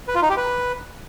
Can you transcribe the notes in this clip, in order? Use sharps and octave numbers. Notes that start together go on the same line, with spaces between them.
B4
F4
D#4
G4
B4